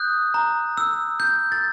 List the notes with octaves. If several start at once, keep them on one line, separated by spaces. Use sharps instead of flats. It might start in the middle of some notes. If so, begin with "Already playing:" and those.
Already playing: D#6 F#6 G6
A#5
E6
G6
A6